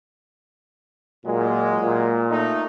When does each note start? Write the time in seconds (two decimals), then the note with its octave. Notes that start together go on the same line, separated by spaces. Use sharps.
1.26 A#2 F#3 G#3
1.80 A#2
2.31 A3 D#4